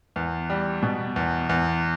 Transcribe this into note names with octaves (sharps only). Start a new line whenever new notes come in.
E2
G3
B2
E2
E2